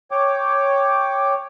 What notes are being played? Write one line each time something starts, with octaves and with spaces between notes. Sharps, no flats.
C#5 G5 D6